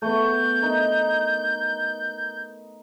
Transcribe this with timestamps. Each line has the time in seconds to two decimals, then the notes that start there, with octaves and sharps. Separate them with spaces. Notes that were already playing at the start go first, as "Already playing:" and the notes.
0.02 A3 B3 G6
0.62 D#4 A#4